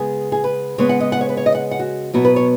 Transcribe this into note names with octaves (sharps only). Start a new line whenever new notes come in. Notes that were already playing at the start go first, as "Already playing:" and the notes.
Already playing: C#3 G#3 B3 G#4
G#4
B4
C#3 G#3 B3 C#5
F#5
D#5
F#5
C#5
B4
C#5
D#5
F#5
F#5
F#4
B2 F#3 B3 F#4
B4
C#5